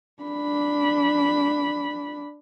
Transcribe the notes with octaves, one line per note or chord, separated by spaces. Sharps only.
D4 B5